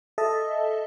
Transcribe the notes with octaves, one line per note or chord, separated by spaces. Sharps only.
A4 D#5 E5 A5